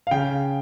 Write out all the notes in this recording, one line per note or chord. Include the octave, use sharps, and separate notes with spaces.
F5
C#3 G5